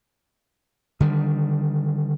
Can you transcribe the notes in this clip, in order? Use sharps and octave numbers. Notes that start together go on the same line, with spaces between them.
D3 D#3 G3